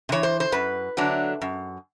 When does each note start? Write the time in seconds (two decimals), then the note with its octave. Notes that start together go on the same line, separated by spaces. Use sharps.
0.09 C3
0.12 E3 C#5
0.23 C5
0.40 C5
0.52 F#2 B4
0.97 D3 F#3 A3 D4
1.41 F#2